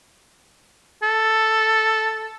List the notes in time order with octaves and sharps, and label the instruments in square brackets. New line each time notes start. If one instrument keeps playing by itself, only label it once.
[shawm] A4